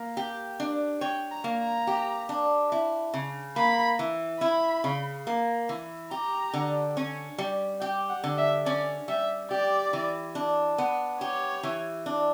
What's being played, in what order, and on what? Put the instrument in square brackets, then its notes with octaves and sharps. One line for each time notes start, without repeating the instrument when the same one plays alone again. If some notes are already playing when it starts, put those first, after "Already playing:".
Already playing: [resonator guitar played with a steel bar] A#3
G4
D4
[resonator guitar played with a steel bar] C#5 [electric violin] G5
[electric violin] A#5
[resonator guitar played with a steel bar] A#3
[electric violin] A#5
[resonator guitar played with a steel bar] G4
D4
E4
C#3
[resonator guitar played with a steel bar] A#3 [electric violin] B5
[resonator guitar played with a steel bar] E3
[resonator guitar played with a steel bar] E4 [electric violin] B5
[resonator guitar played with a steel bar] C#3
A#3
E3
[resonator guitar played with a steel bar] G4 [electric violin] A#5
[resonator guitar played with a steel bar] D3
C#4
G3
[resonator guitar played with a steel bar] G4 [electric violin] G5
[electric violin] F#5
[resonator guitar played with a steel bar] D3
[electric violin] E5
[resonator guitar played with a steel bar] C#4 [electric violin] D5
[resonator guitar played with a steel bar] G3 [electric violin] E5
[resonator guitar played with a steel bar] G4 [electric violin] D5
[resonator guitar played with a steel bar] E3
D4
B3
[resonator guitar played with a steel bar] G4 [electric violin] C#5
[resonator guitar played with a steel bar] E3
D4